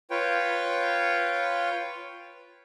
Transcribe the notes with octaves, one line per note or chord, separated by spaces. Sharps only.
F4 B4 C#5 G5